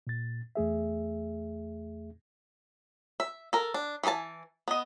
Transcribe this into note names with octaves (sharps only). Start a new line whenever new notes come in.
A#2 A6
E2 A3 G#4 E5
E5
A4 A#4
D4
E3 D#4 G#4 G#5 A5
B3 D#5